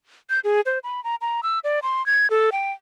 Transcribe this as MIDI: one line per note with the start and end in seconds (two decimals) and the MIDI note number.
0.30 0.40 91
0.44 0.61 68
0.66 0.79 72
0.84 1.03 83
1.04 1.15 82
1.21 1.41 82
1.43 1.59 88
1.64 1.79 74
1.83 2.05 84
2.06 2.30 92
2.30 2.50 69
2.52 2.72 79